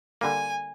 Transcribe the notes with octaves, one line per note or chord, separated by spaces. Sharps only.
D3 G3 A#3 G#5